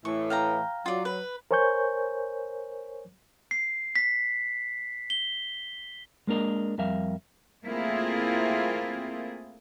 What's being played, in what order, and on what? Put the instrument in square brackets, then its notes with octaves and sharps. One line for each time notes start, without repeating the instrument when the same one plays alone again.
[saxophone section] A2 E3 [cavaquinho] C#6
[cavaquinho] F5 G5 A#5
[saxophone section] F#3 [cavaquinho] F4 D5
[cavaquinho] B4
[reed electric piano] A#4 C5 C#5 G#5 C#6 G6
[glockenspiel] C7
B6
G7
[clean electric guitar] G#3 A#3 D4 A#4 D#5
F2 G3 A#4 E5 F5
[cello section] A3 A#3 C4 E4 F4 G#4